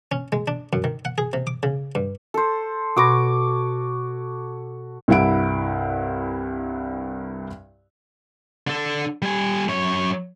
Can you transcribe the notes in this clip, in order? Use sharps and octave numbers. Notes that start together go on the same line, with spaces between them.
C#4
G#3
D4
F#2
D#3
F#5
G#4
C3
D6
C#3
G2
A4 C5
B2 F#4 C#5 B5 D6 A#6
C2 G2 E4 F#5 D7
D3 A4
G3 G#5
F#2 C#5